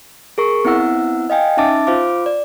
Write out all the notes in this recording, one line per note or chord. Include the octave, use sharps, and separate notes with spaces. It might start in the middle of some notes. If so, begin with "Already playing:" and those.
G#4 A#4 C#6
B3 C4 E4 F#5 E6
D#5 F5 G5 G#5
C#4 D#4 E5 A5 D6 A6
F4 C5 F5 D6
D5